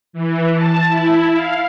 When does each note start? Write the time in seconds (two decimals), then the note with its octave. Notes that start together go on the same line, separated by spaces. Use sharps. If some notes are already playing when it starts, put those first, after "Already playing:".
0.13 E3
0.54 A5
0.89 E4
1.33 F5